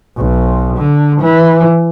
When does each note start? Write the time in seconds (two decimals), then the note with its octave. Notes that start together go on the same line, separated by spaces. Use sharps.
0.17 B1
0.77 D3
1.21 E3